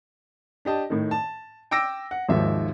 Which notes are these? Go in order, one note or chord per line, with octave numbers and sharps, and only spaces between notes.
D4 G4 D#5 A5
A2 D#3
A5
G5 D6 E6 A#6 D7
F#5
G#1 D#2 G#2 D#3 F3 E5